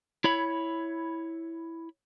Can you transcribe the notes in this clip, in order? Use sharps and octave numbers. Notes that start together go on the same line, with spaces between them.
E4 C#5 B5